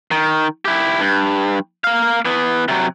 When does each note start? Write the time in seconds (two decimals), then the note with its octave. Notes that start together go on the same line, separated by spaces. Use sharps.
0.11 D#3
0.65 E4 G4
1.00 G2
1.84 A#3 F5
2.25 E3 B3
2.68 C3 F#3